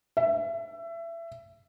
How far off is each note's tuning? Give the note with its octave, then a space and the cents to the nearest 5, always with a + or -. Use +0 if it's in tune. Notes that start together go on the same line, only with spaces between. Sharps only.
E5 +25